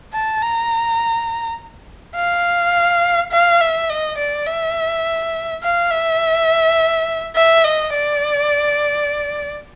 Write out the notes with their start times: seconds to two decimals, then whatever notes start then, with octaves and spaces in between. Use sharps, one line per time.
0.13 A5
0.43 A#5
2.16 F5
3.32 F5
3.61 E5
3.90 D#5
4.18 D5
4.46 E5
5.63 F5
5.91 E5
7.36 E5
7.64 D#5
7.94 D5